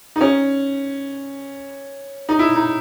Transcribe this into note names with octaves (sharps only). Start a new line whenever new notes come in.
D#4
C#4
D#4
E4
D#4